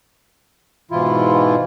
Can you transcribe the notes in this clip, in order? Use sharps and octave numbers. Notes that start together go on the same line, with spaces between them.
G#2 B2 E3 E4 F4